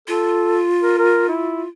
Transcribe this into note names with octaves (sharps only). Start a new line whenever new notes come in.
F4 A4
A#4
A#4
E4